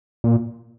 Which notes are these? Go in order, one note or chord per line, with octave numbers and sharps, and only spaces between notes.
A#2